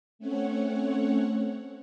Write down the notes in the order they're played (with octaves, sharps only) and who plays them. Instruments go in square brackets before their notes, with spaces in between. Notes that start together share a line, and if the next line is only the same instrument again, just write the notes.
[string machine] A3 C4 C#4 C#5 F#5